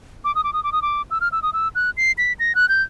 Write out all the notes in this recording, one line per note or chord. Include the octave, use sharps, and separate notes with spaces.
D6
D#6
D6
D#6
D6
D#6
D6
E6
F6
E6
D#6
E6
F#6
C7
B6
A#6
F#6
G6